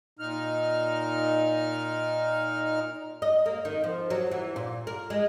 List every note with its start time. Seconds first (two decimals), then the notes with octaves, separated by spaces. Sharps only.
0.19 A#2 D#4 F6
3.22 D#5
3.46 A#3
3.65 D#3
3.84 F3
4.10 F#3
4.31 E3
4.56 A#2
4.87 A#4
5.10 G#3